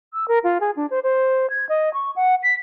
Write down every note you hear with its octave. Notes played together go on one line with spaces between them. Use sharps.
E6
A#4
F4
G#4
D4
C5
C5
G#6
D#5
C#6
F#5
B6